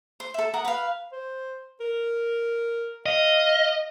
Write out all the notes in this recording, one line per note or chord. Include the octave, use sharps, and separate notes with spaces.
C5
A4 E5
A#4 F#5 D#6
B4 F5
C5
A#4
D#5 F5